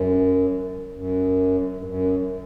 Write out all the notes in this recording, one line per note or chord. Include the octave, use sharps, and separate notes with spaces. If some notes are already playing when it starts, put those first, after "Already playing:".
Already playing: F#2
F#2
G2
F#2